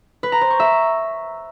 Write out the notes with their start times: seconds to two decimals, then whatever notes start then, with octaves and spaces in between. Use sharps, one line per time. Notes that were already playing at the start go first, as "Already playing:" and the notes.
0.23 B4
0.32 A#5
0.41 C5
0.50 C#6
0.60 E5